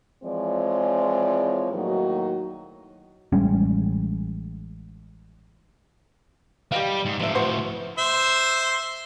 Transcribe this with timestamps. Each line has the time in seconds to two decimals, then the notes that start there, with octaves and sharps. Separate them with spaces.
0.24 E3 F3 G#3 C4 C#5 D5
1.73 A2 D#3 F#3 A#3 D#4 F#4
3.32 A1 G3 G#3 C#4
6.72 G3 G4 D#5 F5
7.05 G#2
7.20 A2 C3 F3 E5
7.35 E3 F#4 C5
7.98 C5 E5 C6